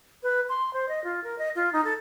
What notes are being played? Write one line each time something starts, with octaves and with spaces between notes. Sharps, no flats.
B4
C6
C5
D#5
F4
A#4
D#5
F4
D#4
A4